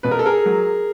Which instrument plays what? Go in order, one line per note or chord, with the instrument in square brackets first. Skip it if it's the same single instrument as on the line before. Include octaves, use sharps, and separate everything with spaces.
[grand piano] B2 B4
A#4
A4
G#4 A#4
F#3